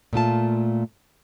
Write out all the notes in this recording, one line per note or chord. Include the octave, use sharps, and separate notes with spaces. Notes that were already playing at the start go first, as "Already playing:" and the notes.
A#2 A3 F4 A5